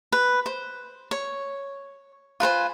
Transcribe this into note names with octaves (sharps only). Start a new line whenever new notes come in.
B4
C5
C#5
F4 B4 C5 G#5